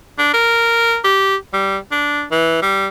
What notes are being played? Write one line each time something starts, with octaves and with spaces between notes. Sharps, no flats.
D4
A#4
G4
G3
D4
E3
G3